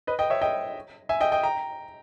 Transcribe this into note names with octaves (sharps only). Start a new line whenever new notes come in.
B4 D#5
D#5 G5
C#5 E5
D#5 G5
E5 G#5
D#5 G5
D#5 G5
G5 A#5